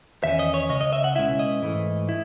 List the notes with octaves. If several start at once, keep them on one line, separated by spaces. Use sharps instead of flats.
E2 D#3 C#4 E5
D#5
C#5
C#2 C#3 D#5
D#5
E5
F#5
B2 G#3 C#4 E4 E5
D#5
G#2 E3 A3
E4